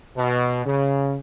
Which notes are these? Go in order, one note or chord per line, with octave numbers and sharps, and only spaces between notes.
B2
C#3